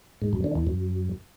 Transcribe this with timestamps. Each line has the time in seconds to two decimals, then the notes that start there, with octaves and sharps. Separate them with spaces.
0.22 G#2
0.33 F#2
0.44 D3
0.55 E2
0.67 F#2